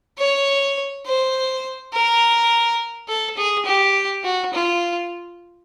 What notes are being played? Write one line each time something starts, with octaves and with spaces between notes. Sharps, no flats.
C#5
C5
A#4
A4
G#4
G4
F#4
F4